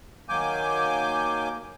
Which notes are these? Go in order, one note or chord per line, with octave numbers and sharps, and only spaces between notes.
D#3 F#3 A#3 G#5 D6 G6